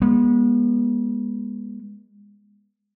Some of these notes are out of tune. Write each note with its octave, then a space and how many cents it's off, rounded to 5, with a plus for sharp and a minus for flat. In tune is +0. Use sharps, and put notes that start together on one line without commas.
G#3 -20 B3 -35